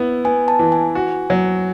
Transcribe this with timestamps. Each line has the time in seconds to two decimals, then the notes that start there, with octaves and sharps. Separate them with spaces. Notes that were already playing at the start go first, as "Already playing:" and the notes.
Already playing: B3 E4
0.24 B3 G#5
0.48 A5
0.59 E3
0.72 G#5
0.95 F#4
1.30 F#3